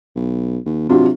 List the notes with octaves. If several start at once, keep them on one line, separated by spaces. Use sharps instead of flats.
B1
D#2
C3 F#3 D4 F4